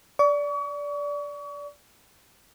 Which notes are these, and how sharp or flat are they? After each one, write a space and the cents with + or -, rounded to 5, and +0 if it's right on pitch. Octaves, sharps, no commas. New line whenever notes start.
D5 -15 C#6 +40